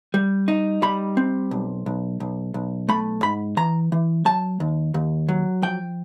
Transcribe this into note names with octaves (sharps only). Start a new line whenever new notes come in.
G3
D#4
G3 B5
C4
B1
B1
B1
B1
A3 B5
G#2 B5
E3 A#5
E3
F#3 A5
D#2
D#2
F#3
F3 G5